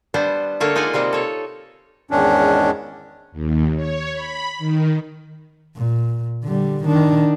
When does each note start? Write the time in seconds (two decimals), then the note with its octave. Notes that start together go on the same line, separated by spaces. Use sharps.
0.14 G3 B3 D4 C5
0.60 D3 A3 A#3 A4 C#5 A5
0.75 G#3 D#4 F4 D5 F#5 G#5
0.93 C3 G3 A#3 C4
1.13 A4 C#5
2.11 E2 G#2 D#3 C#4 D4
3.32 D#2
3.75 C#5
4.12 B5
4.59 D#3
5.76 A#2
6.44 D3 G3
6.85 D#3 D4